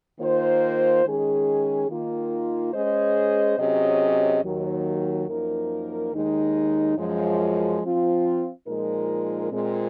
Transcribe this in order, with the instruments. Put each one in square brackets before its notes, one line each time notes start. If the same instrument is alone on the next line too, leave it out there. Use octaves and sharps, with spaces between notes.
[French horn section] D#3 A#3 F4 C5
D#3 G#3 C#4 G#4
D#3 A#3 F4
G#3 C#4 G#4 C5 D#5
C3 F#3 C#4 G#4 D#5
D#2 D#3 F#3
F#2 F3 A#3 D#4 A#4
D#2 D#3 G#3 D#4
F#2 F3 G#3
F3 C4 F4
A#2 F3 G#3 D#4 A#4
A#2 G#3 C4